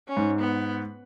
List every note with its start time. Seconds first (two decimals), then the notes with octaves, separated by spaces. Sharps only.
0.08 C#4
0.17 G#2
0.40 B3